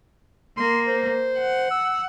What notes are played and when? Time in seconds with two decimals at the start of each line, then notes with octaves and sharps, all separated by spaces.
0.57 A#3 C6
0.87 C5
1.38 F#5
1.71 E6